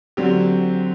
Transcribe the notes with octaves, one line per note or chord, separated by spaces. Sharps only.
D3 F#3 C4 G4